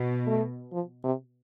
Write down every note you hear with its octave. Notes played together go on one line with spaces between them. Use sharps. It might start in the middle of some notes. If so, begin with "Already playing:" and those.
Already playing: B2
A3
F3
C3